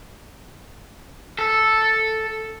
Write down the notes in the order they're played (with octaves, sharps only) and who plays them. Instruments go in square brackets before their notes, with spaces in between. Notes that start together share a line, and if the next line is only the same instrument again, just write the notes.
[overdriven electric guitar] A4